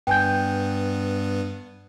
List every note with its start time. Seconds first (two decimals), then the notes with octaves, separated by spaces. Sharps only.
0.07 G2 B3 G5 G#5 G6